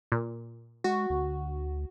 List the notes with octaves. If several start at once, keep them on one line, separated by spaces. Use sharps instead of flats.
A#2
G#3 F#4
D2